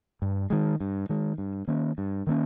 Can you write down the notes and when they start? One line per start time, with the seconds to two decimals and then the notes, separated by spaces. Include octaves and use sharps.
0.22 G2
0.50 D#3 G#3
0.80 G2
1.09 D#3 G#3
1.38 G2
1.67 D#3 A#3 C#4
1.98 G2
2.27 D#3 A#3 C#4